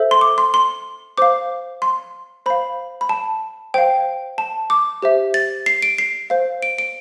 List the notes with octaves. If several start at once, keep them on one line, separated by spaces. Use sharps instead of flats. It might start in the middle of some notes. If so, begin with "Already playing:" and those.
Already playing: A4 C5 E5
C6
D6
C6
C6
C5 F5 D6
C6
C5 F5 B5
B5
A5
C5 F5 G5
A5
D6
G4 C5 E5
A6
C7
D7
C7
C5 F5
D7
D7